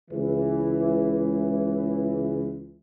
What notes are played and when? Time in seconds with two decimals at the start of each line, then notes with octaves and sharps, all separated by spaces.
0.11 C#2 E3